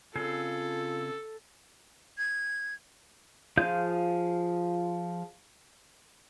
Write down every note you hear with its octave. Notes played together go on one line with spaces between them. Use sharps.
C#3 C4 F4 G#4 A4
G#6
F3 F4 G#4 F5 G6